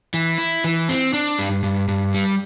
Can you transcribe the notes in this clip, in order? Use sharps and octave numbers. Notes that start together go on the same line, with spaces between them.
E3
E4
E3
C4
D4
G2
G2
G2
G3